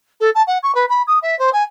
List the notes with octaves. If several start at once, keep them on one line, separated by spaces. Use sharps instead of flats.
A4
A5
F#5
C#6
B4
B5
D#6
E5
C5
G#5